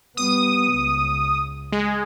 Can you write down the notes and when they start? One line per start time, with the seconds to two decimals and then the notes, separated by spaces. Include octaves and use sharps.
0.17 G3 B3 D#6
0.74 C#2
1.72 G#3